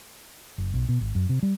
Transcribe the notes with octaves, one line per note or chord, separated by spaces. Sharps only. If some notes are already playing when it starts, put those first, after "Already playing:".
F#1
B1
B2
G#1
F#2
C3
G3